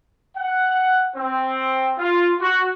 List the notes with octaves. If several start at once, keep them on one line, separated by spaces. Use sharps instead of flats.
F#5
C4
F4
F#4